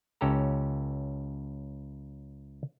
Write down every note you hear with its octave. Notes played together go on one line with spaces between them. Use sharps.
C#2 C#4 G4 A4 A#5